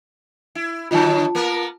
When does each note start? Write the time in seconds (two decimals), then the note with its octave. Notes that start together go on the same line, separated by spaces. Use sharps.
0.55 E4
0.91 B2 D3 F#3 F4 A5
1.35 A#3 B3 A#4